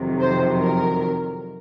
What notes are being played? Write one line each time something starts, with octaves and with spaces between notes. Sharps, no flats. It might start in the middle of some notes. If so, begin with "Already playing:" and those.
Already playing: F2 C3 D#3 F#3
C5
A#4